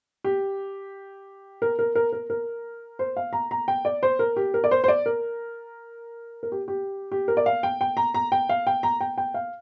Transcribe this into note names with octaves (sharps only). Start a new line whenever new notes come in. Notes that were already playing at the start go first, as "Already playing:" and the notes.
G4
A#4
A#4
A#4
A#4
A#4
C5
F5
A#5
A#5
G5
D5
C5
A#4
G4
A#4
D5
C5
C5
D5
A#4
A#4
G4
G4
G4
A#4
D5
F5
G5
G5
A#5
A#5
G5
F5
G5
A#5
G5
G5
F5